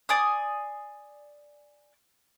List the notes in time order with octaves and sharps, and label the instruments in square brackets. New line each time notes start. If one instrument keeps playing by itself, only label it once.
[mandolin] D5 G#5 C6 D#6